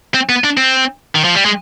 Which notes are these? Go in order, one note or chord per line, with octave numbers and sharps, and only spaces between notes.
C4
B3
D4
C4
D#3
F3
G3
G#3